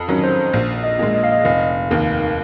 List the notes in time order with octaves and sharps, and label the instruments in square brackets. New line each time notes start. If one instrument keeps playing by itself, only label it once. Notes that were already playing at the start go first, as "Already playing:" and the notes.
Already playing: [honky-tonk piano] F2
D#3 F#3 C#4
[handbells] C5
[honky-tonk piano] A#1
[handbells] D#5
[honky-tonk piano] A#2 G#3
[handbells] D#5
F5
D#5
[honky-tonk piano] F1 [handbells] F5
[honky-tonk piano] D#2 D#3 A#3